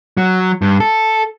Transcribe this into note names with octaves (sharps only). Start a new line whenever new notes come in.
F#3
G2
A4